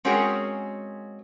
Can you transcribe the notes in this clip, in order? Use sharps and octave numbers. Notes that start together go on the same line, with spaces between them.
G#3 C4 C#4 F#4 G#4 A#4